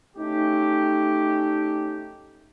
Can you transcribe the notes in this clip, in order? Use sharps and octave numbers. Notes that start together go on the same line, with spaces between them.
A3 C#4 D#4 G4